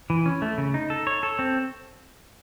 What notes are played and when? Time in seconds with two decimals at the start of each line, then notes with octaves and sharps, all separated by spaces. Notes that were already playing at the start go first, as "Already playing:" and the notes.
0.10 E3
0.26 C#4
0.42 A3
0.58 C#3
0.74 D#4
0.90 A4
1.07 C#5
1.23 A4
1.39 C4